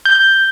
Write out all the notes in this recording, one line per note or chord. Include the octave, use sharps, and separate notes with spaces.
G6